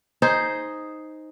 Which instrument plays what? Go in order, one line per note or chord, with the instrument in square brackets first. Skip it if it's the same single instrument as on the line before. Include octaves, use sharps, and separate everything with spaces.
[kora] D#4 G#4 C5